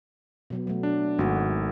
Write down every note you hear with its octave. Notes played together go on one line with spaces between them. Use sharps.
B2 F#3 B3
F#3 A3
D4
G#1 A3 F#4